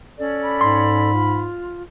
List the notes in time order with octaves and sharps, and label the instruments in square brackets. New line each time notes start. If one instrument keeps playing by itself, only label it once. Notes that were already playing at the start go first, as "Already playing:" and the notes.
[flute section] C#4 A4 D5
[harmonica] B5
[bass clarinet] G#2 [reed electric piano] C6
[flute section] F4